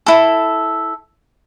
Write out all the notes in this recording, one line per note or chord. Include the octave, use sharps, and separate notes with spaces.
E4 A4